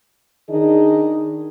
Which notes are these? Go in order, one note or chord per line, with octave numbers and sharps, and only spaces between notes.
D#3 D4 D#4 G#4 D#5